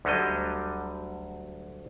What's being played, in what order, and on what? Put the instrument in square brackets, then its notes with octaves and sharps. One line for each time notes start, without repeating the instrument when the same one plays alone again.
[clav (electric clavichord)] D2 D3 F#3 G3 D#5